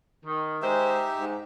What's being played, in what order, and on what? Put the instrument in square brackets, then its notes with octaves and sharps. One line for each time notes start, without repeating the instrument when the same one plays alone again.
[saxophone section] D#3
[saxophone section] G#3 C5 [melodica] D#4 G4 E5
[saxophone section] G#2